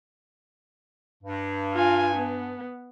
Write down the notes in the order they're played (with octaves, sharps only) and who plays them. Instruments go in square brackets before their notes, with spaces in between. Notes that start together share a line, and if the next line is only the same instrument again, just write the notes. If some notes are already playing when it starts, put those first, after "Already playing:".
[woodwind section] G2
[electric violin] F4 G#5
B3